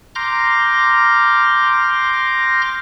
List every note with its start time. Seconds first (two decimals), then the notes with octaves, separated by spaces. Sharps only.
0.15 A#5 C6 D6 F6 G6 A#6